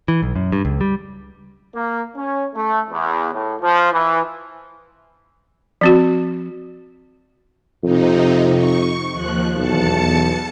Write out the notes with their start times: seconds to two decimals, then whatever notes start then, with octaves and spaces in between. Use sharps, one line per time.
0.08 E3
0.22 B1
0.36 F#2
0.52 G2
0.65 C#2
0.81 G3
1.75 A#3
2.16 C#4
2.55 A3
2.91 E2
3.33 A2
3.62 F3
3.92 E3
5.81 F3 C4 F#4
7.84 F2 C3 D#4
8.56 C#6
9.13 D#2 F3 F#6
9.56 B1 E2 A5 C#7